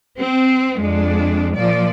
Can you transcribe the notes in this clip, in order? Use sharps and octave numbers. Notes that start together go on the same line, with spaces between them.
C4
F2 G#3 D4
A#2 F3 D5